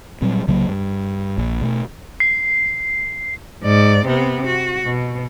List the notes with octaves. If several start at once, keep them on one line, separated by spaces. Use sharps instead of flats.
A#2 F#3 G3 C4
C2 C#3 F#3 A#3
G2
A#1 A#2
B2 A3
C7
G#2 D5
C3 B3
F#4
B2